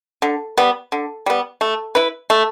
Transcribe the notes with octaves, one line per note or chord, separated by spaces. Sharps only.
D3
G3 B3
D3
G3 B3
A3
E4 B4
A3